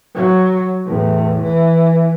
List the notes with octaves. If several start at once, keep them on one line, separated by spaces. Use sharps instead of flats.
F#3
E2 A2
E3